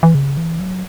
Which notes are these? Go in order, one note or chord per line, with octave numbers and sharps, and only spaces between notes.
E3
C#3
E3
F#3